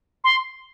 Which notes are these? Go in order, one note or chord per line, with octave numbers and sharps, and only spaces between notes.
C6